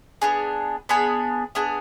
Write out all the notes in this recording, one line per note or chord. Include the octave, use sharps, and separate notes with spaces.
B3 D4 G#4
B3 D4 G#4 B5
B3 D4 G#4